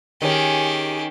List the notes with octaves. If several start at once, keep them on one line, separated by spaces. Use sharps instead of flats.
D#3 C#4 G4 G#4